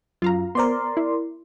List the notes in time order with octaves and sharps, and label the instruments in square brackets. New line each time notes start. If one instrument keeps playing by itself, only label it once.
[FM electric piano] F#2 [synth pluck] F4 F5 A#5
[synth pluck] B3 C5 [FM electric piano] A#4 D5 C6
[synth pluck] E4